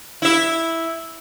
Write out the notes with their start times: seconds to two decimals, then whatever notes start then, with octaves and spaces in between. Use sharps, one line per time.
0.22 E4 E5